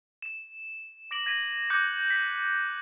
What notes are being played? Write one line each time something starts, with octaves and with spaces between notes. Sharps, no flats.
E7
D6 A#6 D7 F#7
G#6 A#6 B6 D#7 F#7
D6 F#6 G6 A#6 C#7
B6